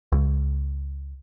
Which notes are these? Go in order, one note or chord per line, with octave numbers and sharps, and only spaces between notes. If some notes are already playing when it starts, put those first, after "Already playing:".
C#2